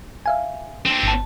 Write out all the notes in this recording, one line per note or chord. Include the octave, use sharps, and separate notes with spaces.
E5 F5 G#5
C4 D4
G1 A5